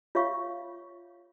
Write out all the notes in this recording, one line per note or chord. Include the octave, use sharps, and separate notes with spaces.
F4 C#5 E5 F5 C#6